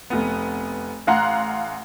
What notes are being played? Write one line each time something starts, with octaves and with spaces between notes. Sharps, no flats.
F1 B3
A1 F5 F#5 A#5 C6 F#6